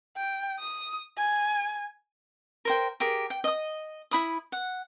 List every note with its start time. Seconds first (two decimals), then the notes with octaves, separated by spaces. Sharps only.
0.17 G5
0.59 D#6
1.18 G#5
2.65 A#4 C5 G5
3.00 G4 G#4 A#4
3.30 G5
3.44 D#5 D#6
4.11 E4 B5 D#6
4.52 F#5